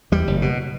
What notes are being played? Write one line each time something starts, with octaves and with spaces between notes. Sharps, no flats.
E2 G3
F#1
B2